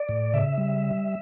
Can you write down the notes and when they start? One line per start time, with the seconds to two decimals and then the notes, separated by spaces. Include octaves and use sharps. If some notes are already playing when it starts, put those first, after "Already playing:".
Already playing: D5
0.09 A2
0.34 C#3 E5
0.58 G3